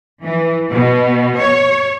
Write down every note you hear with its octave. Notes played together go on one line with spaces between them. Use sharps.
E3
B2
C#5